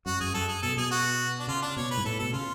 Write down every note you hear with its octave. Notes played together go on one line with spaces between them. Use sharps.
F#2 F#4
F#2 G#4
F#2 A4
G#4
B2 A4
B2 G#4
F#4
D4
C#3 F4
D4
B2 C#5
B4
G#2
A2 A4
B2 A4
C#3 F4